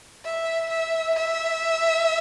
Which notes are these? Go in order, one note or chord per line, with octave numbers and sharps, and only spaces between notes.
E5
E5
E5